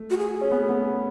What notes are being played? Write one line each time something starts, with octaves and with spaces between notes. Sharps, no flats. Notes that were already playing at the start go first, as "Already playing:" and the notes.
Already playing: A3
F#4
G#4
C#4
B3
A3
B3